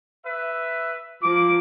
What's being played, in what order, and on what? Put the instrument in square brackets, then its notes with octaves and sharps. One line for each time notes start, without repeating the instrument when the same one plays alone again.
[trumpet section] B4 E5
[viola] F3 [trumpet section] A#3 D6